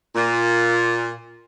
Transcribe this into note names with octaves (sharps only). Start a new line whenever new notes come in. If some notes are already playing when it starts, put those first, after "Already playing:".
A#2